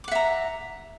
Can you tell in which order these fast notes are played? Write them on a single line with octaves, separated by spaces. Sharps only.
D6 F#5 E5 A#5